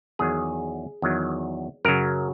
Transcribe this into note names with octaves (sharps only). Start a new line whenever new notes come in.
E2 D#3 F#3 G#4
E2 D#3 F#3
F#2 C#3 F#3 A#4